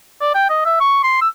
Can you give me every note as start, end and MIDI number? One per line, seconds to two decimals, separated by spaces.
0.21 0.33 74
0.35 0.49 79
0.50 0.62 75
0.65 0.77 76
0.80 0.99 85
1.04 1.21 84
1.21 1.28 88